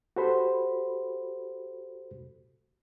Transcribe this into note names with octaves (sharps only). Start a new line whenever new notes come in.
F#4 G4 A4 C5 B5